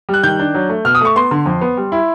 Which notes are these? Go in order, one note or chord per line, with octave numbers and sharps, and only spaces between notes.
G3
F#6
D#3 G6
D4
F#3
A3
B2 F6
D#6
A3 C#6
B3 C6
D3
F2
B3
G3
E4